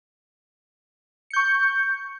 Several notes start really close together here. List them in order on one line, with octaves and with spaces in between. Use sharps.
C#7 G6 C#6